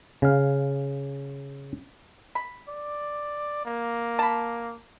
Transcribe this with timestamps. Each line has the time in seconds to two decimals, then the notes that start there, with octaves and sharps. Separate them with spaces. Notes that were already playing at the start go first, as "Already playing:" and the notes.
0.22 C#3 F5
2.35 B5
2.68 D5
3.65 A#3
4.19 A5 B5